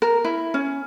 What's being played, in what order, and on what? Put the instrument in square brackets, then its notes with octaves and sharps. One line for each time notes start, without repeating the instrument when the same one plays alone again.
[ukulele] A#4
E4
C#4